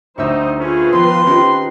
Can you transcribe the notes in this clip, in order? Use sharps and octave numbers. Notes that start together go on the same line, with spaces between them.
D2 G3 D#4 C5 E5 C#6 E6 G6
A3 C#4 F4 G#4 B4 C5
D#3 F3 B3 C6
D#3 C#4 G4 A#4